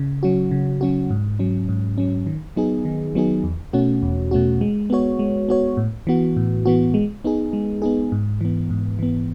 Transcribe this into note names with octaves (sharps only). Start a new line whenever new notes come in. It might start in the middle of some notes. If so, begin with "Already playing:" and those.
Already playing: C#3
F#3 C#4 F#4
C#3
F#3 C#4 F#4
G#2
F#3 C#4
G#2
F#3 C#4
D#3
F#3 B3 D#4 G#4
D#3
F#3 B3 D#4 G#4
E2
B2 A3 C#4 F#4
E2
B2 A3 C#4 F#4
G#3
B3 F#4 C#5
G#3
B3 F#4 C#5
A2
E3 B3 F#4
A2
E3 B3 F#4
G#3
B3 D#4 G#4
G#3
B3 D#4 G#4
G#2
E3 B3
G#2
E3 B3